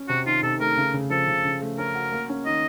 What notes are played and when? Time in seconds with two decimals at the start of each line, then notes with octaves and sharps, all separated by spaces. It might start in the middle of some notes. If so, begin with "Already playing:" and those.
Already playing: C#4
0.09 C3 F#4
0.26 D#3 F4
0.43 C3 A4
0.60 A3 A#4
0.77 C#3
0.94 C#3
1.10 F3 A4
1.27 C#3
1.45 C#3
1.61 A3
1.78 C#4 A#4
1.95 F#4
2.12 A#3
2.29 C#4
2.46 D#3 D#5